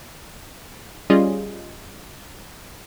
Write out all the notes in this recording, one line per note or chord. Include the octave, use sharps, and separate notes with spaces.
G3 C#4 F4 G#4 D#5